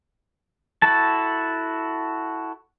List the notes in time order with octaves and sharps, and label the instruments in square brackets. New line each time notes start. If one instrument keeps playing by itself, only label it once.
[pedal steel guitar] E4 F#4 A4 A5